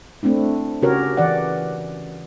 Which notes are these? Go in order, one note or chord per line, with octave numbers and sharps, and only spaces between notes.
A3 C4 D4 E4
C#3 C#4 F#4 G4 A#4 C#5
E3 D5 F#5